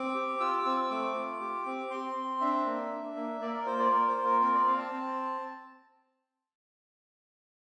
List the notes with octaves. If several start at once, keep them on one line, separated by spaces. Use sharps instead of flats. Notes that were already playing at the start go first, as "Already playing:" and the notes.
Already playing: C4 D6
G4
F4 E6
D6
C4 E6
E6
A3 D6
F4
G4
C4
C4 C6
C4
D4 E5
A#3
D4
A#3
A#3 D5
A#4
F4 C5
D5
A#3 A#4
C5
F4
A#4
C4 A#4
D5
C4 F5
A5
C4